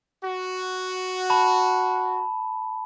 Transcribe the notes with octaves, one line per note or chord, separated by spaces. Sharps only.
F#4
A5 B5